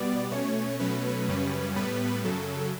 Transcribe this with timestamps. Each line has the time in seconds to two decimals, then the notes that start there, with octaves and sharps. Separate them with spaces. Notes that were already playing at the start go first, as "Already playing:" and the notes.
Already playing: B2 G3 B3 D5
0.31 B2 A3 C#4 C#5
0.80 B2 F#3 A3 C#4 B4
1.28 F#2 C#3 G3 C#4
1.76 A2 G3 B3 B4
2.24 F#2 C#3 F#3 A4